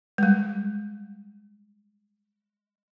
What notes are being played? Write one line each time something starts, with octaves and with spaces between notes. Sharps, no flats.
G3 G#3